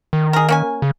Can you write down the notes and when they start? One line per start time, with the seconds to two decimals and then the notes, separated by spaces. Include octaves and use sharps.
0.13 D#3
0.33 G#4 A#4
0.49 A#3 C#4 G#5
0.82 C#3